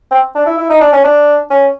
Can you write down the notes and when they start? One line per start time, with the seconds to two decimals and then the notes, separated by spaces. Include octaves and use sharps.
0.11 C4
0.35 D4
0.46 E4
0.58 E4
0.70 D#4
0.81 D4
0.93 C#4
1.04 D4
1.51 C#4